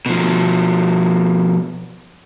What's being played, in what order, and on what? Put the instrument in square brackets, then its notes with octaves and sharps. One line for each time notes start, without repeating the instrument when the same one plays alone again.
[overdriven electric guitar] B2 F3